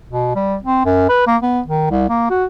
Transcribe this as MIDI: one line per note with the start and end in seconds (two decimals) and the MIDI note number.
0.09 0.34 47
0.35 0.57 55
0.62 0.83 60
0.85 1.06 42
1.09 1.23 71
1.27 1.37 58
1.42 1.60 59
1.66 1.87 51
1.91 2.09 36
2.09 2.27 58
2.30 2.45 66